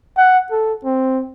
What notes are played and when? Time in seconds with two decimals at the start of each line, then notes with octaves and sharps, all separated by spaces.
0.17 F#5
0.51 A4
0.85 C4